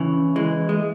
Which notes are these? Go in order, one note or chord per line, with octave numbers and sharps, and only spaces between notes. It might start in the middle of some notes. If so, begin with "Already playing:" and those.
Already playing: C#3 E3
E3 G#3
G#3